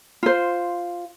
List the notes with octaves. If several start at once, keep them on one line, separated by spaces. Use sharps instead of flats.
F4 C5